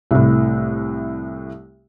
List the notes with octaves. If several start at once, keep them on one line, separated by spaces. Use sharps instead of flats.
C2 A2